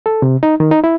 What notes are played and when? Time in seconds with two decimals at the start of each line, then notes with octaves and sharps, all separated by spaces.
0.06 A4
0.22 C3
0.43 D#4
0.60 D#3
0.71 D#4
0.84 E4